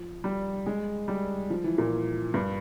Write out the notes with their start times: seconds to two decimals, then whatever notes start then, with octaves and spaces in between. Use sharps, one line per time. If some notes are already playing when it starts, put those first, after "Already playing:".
Already playing: F3
0.24 G3
0.66 G#3
1.08 G3
1.50 F3
1.64 E3
1.78 A#2
2.34 G2